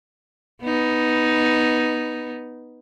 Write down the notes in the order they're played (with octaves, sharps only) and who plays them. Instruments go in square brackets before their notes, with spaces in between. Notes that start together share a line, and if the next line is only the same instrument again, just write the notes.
[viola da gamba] B3 D#4